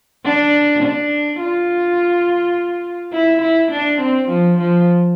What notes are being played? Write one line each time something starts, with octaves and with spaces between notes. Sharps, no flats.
D4
D4
F4
E4
E4
D4
C4
F3
F3